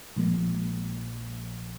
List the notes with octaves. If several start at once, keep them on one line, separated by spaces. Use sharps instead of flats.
A#1 F3 G#3 A#3